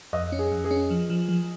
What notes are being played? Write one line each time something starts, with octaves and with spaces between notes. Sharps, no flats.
F2 D#5
C#4
G#4
F2
G#4
C#4
F3
F3
F3